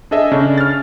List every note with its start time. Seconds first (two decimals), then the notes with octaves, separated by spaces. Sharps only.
0.11 D4 G#4 A4 D#5 E5
0.32 C#3 C#4 D4
0.58 F6 A6